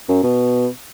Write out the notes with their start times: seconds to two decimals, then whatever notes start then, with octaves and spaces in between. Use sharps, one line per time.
0.08 F#2
0.23 B2